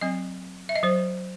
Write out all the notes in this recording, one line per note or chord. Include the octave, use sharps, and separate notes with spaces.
F#3 C4 D#5
E5
D#5
F#3 C5